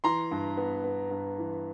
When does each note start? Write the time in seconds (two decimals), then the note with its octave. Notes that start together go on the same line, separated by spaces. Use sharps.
0.04 E3 A#5 C6
0.31 G2
0.57 B3
0.84 B3
1.11 G2
1.38 E3